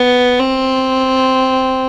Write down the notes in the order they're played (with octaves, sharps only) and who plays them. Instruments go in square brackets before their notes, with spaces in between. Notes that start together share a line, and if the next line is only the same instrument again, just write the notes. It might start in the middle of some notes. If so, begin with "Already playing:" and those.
Already playing: [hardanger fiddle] B3
C4